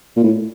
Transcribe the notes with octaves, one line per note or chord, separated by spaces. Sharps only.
A#2
A2